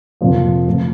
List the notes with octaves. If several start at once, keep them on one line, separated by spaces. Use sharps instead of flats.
F2 C3 F3 A#3
C3 F3 A3